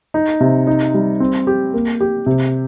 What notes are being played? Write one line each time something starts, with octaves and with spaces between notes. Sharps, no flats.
D#4
C3
D#4
G3
C4
G4
A#3
G4
C3